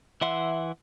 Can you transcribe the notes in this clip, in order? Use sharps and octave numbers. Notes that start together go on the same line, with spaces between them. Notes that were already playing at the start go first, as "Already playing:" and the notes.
E3 E5 F#5 C6